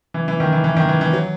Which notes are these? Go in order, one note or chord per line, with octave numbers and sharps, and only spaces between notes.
E3
E3
D#3
E3
E3
D#3
E3
E3
F#3